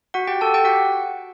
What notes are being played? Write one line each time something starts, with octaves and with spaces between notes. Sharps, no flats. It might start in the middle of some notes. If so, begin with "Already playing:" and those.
F#4 F#5
G4 G5
A4 A5
G4 G5
F#4 F#5